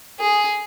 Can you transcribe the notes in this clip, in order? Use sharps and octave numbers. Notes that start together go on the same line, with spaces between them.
G#4